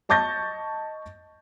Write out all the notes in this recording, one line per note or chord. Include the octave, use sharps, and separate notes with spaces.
D#5 A5 C#6 G6 A6 A#6